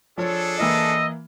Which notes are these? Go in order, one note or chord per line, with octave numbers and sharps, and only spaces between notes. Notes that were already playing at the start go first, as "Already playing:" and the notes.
F3 D4 G#4 A4 C#5
E3 A#3 E4 D#5 E6